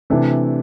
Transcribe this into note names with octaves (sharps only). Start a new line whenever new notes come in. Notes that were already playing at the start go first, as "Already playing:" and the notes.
C3 E3 A3 D4 A4